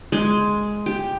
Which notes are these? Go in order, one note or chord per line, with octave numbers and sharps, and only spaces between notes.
G#3
G4